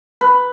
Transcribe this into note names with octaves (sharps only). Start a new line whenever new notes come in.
B4